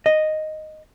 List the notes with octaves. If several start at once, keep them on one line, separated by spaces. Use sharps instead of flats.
D#5